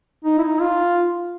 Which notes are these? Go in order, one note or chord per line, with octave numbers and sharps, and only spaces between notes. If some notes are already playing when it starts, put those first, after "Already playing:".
D#4
E4
D#4
F4